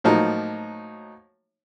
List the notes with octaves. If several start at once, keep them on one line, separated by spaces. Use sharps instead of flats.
A2 F3 F#3 A#3 D#4